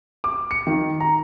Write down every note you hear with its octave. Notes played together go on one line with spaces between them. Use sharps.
D6
C#7
D#3
A#5